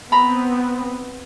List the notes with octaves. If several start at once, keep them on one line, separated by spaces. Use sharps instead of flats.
B3 C4 A#5 B5